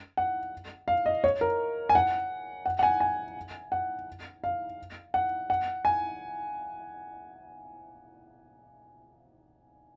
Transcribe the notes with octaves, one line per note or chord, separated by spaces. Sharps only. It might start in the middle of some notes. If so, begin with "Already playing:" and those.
F#5
F5
D#5
C#5
A#4
G#5
F#5
F#5
F#5
G#5
G#5
F#5
F5
F#5
F#5
G#5